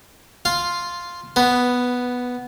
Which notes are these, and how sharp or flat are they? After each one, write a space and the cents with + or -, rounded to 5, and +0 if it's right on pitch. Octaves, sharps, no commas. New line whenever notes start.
F4 +0 F5 +0
B3 +0 B4 +15